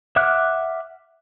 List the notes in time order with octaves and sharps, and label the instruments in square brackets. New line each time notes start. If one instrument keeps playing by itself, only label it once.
[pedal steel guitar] E5 F#5 D6 F6 F#6